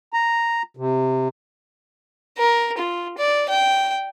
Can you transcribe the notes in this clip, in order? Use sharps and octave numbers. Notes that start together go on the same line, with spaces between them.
A#5
C3
A#4
F4
D5
G5